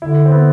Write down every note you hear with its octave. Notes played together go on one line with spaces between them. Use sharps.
D3 E4
C4
B3